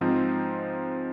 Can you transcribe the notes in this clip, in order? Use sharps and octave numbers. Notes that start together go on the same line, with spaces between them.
G#2 F3 C4 D#4